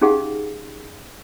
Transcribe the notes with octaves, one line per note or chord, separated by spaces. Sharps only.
C#4 D#4 G4 G#4 F5 F#5